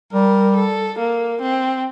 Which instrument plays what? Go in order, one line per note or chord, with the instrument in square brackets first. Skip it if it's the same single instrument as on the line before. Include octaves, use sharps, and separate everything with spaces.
[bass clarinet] G3 [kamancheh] A#4
[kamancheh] A4
A#3
C4